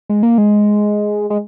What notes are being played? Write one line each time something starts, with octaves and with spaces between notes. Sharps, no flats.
G#3
A#3
G#3
G#3